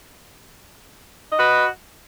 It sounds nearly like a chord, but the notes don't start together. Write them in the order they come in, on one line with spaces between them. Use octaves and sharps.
D#5 F#4 B4